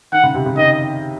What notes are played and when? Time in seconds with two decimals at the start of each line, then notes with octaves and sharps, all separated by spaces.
0.12 D#3 F#5
0.23 C#3
0.34 C3
0.46 C#3
0.57 D#3 D#5